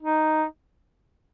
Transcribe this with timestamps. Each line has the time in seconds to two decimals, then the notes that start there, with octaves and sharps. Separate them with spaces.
0.02 D#4